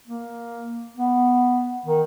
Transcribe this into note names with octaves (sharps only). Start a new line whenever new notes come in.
A#3
B3
D#3